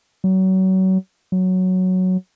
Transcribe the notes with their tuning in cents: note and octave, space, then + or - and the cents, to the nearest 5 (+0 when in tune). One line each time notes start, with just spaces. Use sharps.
F#3 +30
F#3 +0